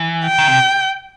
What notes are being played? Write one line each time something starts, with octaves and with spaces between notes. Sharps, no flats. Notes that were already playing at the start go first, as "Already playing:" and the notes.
Already playing: E3
G5
D#3
C3